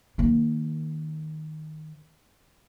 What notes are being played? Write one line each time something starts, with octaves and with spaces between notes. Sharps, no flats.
D#3 A#3